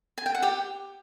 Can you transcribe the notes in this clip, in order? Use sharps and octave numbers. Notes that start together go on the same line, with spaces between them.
G#5
G5
F#5
G4 G5